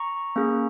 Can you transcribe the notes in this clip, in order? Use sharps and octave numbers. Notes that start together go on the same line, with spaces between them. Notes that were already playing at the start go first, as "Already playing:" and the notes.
Already playing: A#5 C#6
A#3 C#4 G#4